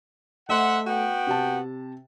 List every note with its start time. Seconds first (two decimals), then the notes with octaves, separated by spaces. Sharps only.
0.49 A3 C5 D#5 E5 F#5
0.86 B3 F#4 G5
1.27 C3 A5